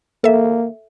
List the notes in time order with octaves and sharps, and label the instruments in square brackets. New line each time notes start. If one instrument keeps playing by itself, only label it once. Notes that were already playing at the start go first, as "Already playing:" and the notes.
[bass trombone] A#3 [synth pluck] A4 E5